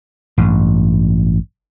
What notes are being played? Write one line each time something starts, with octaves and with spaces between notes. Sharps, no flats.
A1 G2